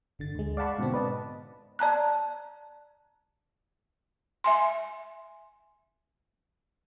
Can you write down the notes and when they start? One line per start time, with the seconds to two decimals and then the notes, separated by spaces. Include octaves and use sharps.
0.19 G1 D3 A6
0.35 D2 G#3
0.57 D5 F5 F#5 A5 B5 C#6
0.78 G#2 B2 D3 C4
0.94 B4 D5 D#5 A5
1.79 D5 A5 A#5 F#6
4.44 E5 G#5 C6